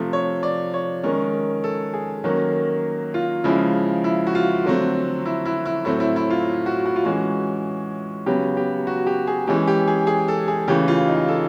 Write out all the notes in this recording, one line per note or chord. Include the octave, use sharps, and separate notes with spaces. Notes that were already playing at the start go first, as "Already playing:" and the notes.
Already playing: C3 F3 A3
C#5
D5
C#5
D#3 G#3 C#4 A#4
A4
G#4
D#3 F#3 A#3 C#4
F4
C#3 F3 G#3 E4
E4
F#4
F4
D3 F#3 A3 C4
E4
E4
E4
A2 F#3 A3 C4 E4
E4
E4
F4
F#4
F#4
F4
E3 G#3 C#4 F#4
C#3 F#3 B3 G4
G4
F#4
G4
G#4
E3 G#3 C#4 G4
G4
G#4
G#4
A4
G#4
C#3 E3 A3 G4
F4
D#4
A4